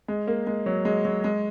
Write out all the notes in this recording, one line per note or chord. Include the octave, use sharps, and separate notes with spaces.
G#3
A#3
G#3
F#3
G#3
F#3
G#3